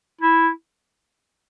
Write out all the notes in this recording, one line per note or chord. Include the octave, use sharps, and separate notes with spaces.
E4